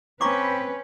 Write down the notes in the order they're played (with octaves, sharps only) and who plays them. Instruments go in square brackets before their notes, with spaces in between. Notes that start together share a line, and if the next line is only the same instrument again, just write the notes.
[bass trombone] C4 [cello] C#4 [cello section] B4 [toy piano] A#5 C#6 D6